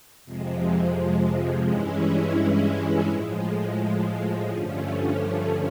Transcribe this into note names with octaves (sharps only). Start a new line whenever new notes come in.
F2 C3 F3 G#3
G2 E3 G#3 C#4 E4
A2 F3 G#3
G2 D3 F3 A3 C#4